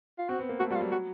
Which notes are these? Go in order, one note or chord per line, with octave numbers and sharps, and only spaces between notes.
F4
C4 F#4
B3
A#3
A3 F#4
G3 F4 F#4
F#3
F#3 F#4